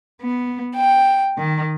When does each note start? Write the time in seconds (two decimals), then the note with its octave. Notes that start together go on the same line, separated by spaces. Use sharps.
0.21 B3
0.76 G5
1.38 D#3